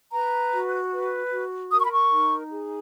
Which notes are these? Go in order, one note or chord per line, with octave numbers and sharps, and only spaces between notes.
B4 A#5
F#4
B4
F#4
A#4 D#6
C#6
B5
C#6
D#4
G#4